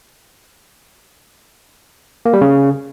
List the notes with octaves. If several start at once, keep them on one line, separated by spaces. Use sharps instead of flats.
A#3
G3
C#3